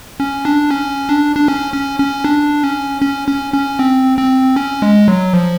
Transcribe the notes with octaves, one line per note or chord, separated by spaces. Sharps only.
C#4
D4
C#4
D4
D4
C#4
C#4
C#4
D4
C#4
C#4
C#4
C#4
C4
C4
C#4
G#3
F#3
F3